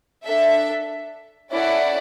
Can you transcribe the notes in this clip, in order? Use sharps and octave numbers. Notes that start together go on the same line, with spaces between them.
D4 A4 E5
C#4 E4 A4 D5 F#5